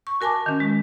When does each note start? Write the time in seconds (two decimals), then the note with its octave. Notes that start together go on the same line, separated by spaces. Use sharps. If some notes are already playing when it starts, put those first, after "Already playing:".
0.07 C#6
0.21 F#4 A#4 G#5 A5 D6
0.46 D#3 C#4
0.60 G#3